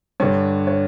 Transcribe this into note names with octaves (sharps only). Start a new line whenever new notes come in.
G2 D3 C#5
C#5